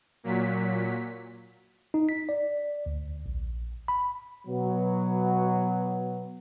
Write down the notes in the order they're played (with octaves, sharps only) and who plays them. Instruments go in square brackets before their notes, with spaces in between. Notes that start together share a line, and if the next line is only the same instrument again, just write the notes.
[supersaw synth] A#2 F#3 B6
[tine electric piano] D#4
B6
D5
D2
A#1
B5
[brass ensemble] B2 F#3 B3